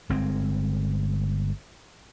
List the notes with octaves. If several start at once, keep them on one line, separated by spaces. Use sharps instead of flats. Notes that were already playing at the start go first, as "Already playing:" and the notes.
G1 G#3 C4